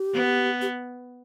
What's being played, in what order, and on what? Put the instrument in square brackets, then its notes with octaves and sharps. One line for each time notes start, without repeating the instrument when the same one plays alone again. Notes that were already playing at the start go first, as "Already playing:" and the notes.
Already playing: [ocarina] G4
[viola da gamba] B3
[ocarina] G4